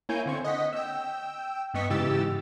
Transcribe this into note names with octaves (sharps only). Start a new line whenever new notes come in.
A#3 E4 C#5 G#5 G6
D3 C4 C#6
D#5 F#5 B6
G5 E6
G2 B3 D#5 C#6 B6
G#2 C#3 E3 G4 E6 A6